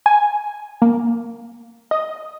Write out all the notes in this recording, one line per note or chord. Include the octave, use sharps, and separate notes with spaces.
G#5
A#3
D#5